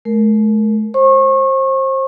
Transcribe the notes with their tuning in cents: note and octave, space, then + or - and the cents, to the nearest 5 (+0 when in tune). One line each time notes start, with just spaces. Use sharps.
A3 -40 A#4 +0
C5 +25 C#6 -30